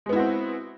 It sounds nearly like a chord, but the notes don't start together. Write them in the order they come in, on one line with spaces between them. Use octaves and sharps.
G#3 B3 E4 F#4 C4